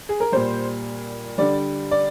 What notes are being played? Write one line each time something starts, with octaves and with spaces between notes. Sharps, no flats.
G#4
A#4
A#2 G3 C5
D3 G3 D5
D5